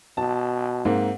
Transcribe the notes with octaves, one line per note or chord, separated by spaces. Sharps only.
B2 A5
G#2 A#3 C4